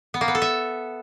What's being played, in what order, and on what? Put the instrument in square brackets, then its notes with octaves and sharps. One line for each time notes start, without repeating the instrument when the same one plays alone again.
[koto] B3
A#3
B3
A4
E5